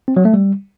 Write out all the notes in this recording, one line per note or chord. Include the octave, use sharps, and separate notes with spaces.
C4
F#3
A3
G3